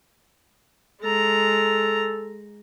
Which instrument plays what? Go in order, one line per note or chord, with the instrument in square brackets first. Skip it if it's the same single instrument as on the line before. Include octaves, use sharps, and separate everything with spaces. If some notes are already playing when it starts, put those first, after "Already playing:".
[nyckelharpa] G#3 A#5 [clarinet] A4